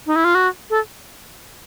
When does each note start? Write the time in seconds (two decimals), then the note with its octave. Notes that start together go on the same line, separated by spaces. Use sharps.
0.07 D#4
0.16 E4
0.25 F4
0.35 F#4
0.70 A4